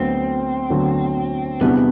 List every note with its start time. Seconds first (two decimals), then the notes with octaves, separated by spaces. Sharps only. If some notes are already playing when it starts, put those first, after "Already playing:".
Already playing: D2 D3 F#3 B3 C4
0.70 D2 D3 F#3 B3
1.61 E2 C3 G3 B3 D4 F#4